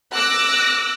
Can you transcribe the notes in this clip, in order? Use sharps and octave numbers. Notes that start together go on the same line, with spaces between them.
D6 E6 F#6 A#6